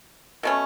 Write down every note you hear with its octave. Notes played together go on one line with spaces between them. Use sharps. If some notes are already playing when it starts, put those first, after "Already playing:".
B2 A3 C#4